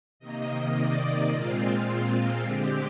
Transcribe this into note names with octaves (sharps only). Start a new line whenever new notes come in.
C3 D#3 A#3 D#5
D5
A#2 G#3 C4 F4
D3 G#3 C4 G4